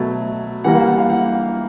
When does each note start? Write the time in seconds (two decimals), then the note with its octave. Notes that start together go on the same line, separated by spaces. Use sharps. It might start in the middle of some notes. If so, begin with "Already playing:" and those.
Already playing: B2 F#3 A3
0.64 E3 G3 A#3 F#5
0.75 F5
0.87 F#5
0.98 F5
1.10 F#5